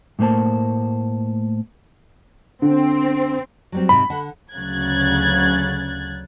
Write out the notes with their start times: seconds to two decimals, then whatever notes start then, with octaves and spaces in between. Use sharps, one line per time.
0.19 A2 A3 A#3 C5 A5
2.62 D3 C4
3.72 F#3 G3 C4
3.89 G#2 C3 B5
4.10 D3 F#5
4.53 D2 C#3 F#3 F#6 G#6 A6